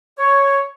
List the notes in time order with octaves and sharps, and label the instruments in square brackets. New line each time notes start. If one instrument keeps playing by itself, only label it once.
[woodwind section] C#5